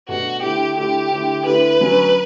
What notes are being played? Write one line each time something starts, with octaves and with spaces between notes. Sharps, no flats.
B2 A3 D4 F#4
D3 A3 E4 G4
D3 A3 E4 G4
D3 A3 E4
D3 A3 E4 B4
D3 F#3 C#4